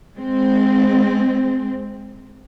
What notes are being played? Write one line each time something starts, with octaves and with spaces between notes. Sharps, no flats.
G#3 C4